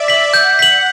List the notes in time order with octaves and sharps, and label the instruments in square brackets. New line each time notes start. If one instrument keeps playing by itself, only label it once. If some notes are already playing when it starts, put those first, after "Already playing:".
Already playing: [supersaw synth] D5 E5
[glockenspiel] B6 F#7
[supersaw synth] F#5 [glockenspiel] G6
[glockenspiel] B6 F#7